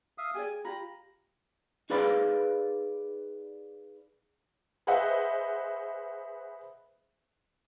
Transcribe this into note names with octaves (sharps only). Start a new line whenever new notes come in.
E5 F5 D#6
G4 G#4 D5 G#5
F4 G4 A#5 B5
D#4 G#4 B4 D5 F5 B5
G#4 B4 C5 D#5 E5 F#5